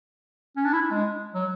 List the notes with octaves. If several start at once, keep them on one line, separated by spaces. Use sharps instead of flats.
C#4
D4
E4
D4
G#3
F#3